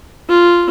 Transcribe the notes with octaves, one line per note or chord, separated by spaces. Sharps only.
F4